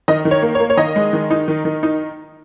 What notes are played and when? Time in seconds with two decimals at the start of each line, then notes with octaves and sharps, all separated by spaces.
0.08 D#3 D#5
0.25 D#3
0.31 C#5
0.42 A#3
0.55 C#5
0.60 A#3
0.70 C#5
0.77 D#3 D#5
0.96 G#3
1.13 D#3
1.30 D#4
1.48 D#3
1.65 D#3
1.83 D#4